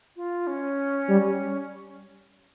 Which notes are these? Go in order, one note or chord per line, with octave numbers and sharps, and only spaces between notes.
F4
C#4
G3